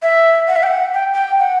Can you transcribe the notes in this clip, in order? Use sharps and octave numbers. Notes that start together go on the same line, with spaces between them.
E5
F#5
E5
G5
F#5
G5
G5
F#5